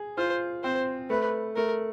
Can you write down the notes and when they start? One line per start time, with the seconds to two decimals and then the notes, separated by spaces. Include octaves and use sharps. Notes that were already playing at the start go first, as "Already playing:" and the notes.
Already playing: G#4
0.17 F4 C5
0.63 C4 C5
1.10 A3 B4
1.56 A3 A#4